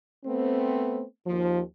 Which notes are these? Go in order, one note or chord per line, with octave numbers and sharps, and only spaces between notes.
A3 B3 C4
D#2 F3